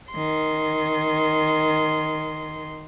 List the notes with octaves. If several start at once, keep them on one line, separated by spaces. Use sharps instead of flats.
D#3 C6